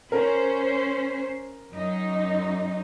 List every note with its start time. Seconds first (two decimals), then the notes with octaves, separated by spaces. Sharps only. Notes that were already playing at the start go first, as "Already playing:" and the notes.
0.12 C#4 A#4 C5
1.73 F#2 D#4